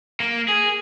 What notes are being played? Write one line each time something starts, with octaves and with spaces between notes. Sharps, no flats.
A#3
G#4